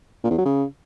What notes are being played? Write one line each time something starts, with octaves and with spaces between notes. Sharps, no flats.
A#2
E2
F#3
C#3